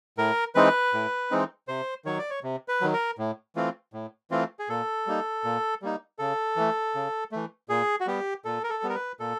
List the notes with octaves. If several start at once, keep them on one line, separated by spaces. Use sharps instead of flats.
A2 A#4
E3 G#3 C4 D#4 B4
A2
E3 G#3 C4 D#4
C3 C5
D#3 F#3 C#5
D5
C#5
C3
B4
D#3 F#3
A#4
A2
E3 A3 C4 F4
A2
E3 A3 C4 F4
G#4
A#2 A4
G3 A#3 D#4
A#2
G3 A#3 D#4
C#3 A4
E3 A3
C#3
E3 A3
A#2 G#4
F#4
G3 B3 G4
A#2 A4
A#4
A4
G3 B3
A#4
B4
A#2 A4